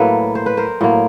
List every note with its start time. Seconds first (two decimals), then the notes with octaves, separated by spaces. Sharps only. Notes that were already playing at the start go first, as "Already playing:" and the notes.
Already playing: A2 F#3 A#3 A4 B4
0.35 C5
0.46 B4
0.57 A#4 C5
0.81 A2 F#3 A#3